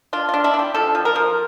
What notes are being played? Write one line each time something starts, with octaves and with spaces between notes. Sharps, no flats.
D4 F4
D4 F4
E4
D4
G4
F3 A4
F3
A#4
F3